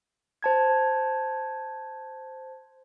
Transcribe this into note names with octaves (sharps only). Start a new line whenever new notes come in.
C5 A5 G#6